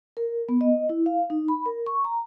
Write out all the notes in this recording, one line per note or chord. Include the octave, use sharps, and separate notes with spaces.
A#4
B3
D#5
E4
F5
D#4
B5
A#4
C#6
A#5